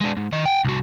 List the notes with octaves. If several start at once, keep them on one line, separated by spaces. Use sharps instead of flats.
G#3 D4
G#2
D#3 D#5
F#5 G5
C2 F#4